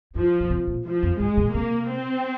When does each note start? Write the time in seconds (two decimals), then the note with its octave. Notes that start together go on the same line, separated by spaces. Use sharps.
0.15 G2 F3
0.40 A#2
0.50 C3
0.67 A#2
0.85 F3
1.03 F2
1.19 G2 G#3
1.37 A#2
1.47 D3
1.54 C3 A#3
1.89 C4